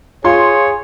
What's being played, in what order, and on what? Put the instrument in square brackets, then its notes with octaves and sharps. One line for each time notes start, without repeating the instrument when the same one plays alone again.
[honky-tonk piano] F4 C6 [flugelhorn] G#4 [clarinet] C#5